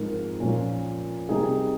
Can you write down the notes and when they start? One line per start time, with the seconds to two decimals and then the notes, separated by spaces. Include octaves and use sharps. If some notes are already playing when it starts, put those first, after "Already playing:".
Already playing: G#2 F3 C4 F4 A#4
0.40 A#2 F3 A#3 C#4 F4
1.29 C3 G3 A#3 D#4 G#4